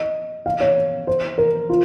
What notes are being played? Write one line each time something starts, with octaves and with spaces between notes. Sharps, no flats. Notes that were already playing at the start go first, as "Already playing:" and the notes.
Already playing: D#5
F5
C#5
C5
A#4
F4